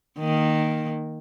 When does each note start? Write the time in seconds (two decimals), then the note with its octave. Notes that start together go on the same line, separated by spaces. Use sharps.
0.19 D#3 A#3